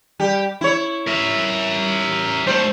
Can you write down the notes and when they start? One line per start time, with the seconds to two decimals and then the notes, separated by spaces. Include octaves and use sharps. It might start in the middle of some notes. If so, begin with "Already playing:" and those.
0.19 G3 G4
0.61 E4 C#5
1.08 A#4 E5
2.47 G3 A3 C5